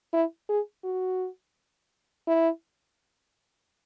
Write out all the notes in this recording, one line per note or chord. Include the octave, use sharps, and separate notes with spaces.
E4
G#4
F#4
E4